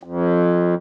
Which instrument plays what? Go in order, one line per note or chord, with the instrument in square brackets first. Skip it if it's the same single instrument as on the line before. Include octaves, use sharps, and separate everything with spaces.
[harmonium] F2